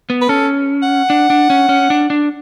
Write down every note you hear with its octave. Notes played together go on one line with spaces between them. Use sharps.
B3
B4
C#4 A4
F#5
D4
D4
C#4
C#4
D4
D4